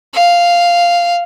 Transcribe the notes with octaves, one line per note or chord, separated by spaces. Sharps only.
F5